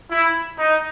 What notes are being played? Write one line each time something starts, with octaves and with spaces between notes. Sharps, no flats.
E4
D#4